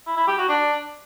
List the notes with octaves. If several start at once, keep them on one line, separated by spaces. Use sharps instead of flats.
E4
E4
G4
F#4
D4